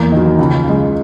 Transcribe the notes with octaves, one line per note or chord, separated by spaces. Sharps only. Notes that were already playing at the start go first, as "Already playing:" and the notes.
Already playing: E2 A#3
D#3 F#3
C#2
C#3 G#3